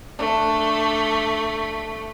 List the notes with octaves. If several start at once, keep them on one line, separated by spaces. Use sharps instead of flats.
A3 D4